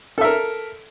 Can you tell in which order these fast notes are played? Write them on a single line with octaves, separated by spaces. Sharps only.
A4 E5 A#4